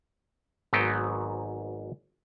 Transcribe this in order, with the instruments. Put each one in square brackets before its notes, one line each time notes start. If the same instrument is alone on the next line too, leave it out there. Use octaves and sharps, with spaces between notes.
[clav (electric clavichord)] G#1 G#2 F#3 B3 D#4 G5